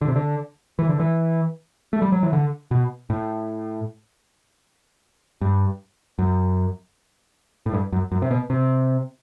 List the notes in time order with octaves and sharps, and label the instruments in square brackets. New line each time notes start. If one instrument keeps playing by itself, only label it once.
[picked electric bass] D3
C3
D3
E3
D3
E3
A3
G3
F#3
E3
D3
B2
A2
G2
F#2
A2
G2
F#2
F#2
C3
B2
C3